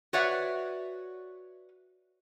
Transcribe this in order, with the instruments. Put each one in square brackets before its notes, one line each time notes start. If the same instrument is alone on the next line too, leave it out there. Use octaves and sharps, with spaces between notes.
[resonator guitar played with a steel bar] F#4 B4 C#5 D5 E5 F#5